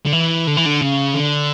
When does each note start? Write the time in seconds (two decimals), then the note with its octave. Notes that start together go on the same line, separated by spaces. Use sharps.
0.06 D3
0.12 E3
0.47 D3
0.57 E3
0.66 D3
0.81 C#3
1.14 D3